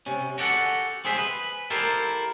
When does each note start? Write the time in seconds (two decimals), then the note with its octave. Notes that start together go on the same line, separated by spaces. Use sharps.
0.06 C3 C#4
0.38 F#4 G4 A4 F#5
1.05 C4 G#4 C5 E5
1.18 B4
1.70 E4 G4 A4 A#4 C5